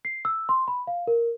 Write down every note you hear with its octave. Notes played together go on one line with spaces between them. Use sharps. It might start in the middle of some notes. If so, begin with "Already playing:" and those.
C7
E6
C6
B5
F5
A#4